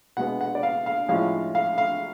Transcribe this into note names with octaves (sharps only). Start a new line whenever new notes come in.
B2 G#3 B3 F#5
F#5
D5
F5
F5
A2 F3 G#3 C#4 F5
F5
F5